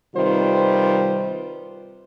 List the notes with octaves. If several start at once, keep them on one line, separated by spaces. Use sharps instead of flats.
C3 D#3 G3 F4 B4 C5